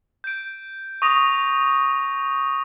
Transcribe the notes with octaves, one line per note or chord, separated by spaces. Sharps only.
G6 D7
C#6 D#6 A#6 F7